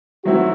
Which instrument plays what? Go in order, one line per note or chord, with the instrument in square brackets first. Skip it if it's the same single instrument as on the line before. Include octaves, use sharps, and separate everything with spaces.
[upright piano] D#3 F#3 A3 C4 E4 [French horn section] F#4